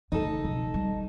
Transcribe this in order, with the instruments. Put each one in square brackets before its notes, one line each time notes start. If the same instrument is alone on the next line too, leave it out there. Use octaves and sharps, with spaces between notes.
[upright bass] C#3 A3 [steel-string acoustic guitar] D#4 A4
[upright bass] B1 F3
G3